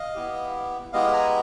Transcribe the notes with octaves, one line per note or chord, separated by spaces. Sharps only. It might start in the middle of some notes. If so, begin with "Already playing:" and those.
Already playing: D#5 F5
B3 E4 G4
G#3 B3 E4 G4 D#5 F5
G#5 A#5